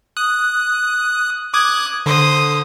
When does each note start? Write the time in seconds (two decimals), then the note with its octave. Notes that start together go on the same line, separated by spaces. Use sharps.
0.17 D#6 F#6
1.54 D6 D#6 F#6 G#6
2.06 D3 C5 D#6